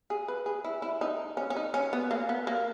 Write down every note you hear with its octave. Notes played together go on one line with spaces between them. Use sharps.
G#4
B4
G#4
E4
E4
D#4
C#4
C#4
D#4
C#4
B3
A#3
B3
A#3